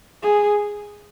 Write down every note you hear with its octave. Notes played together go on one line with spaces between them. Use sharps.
G#4